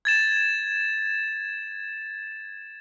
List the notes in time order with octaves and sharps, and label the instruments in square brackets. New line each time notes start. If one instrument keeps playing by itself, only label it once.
[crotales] G#6 A6 E7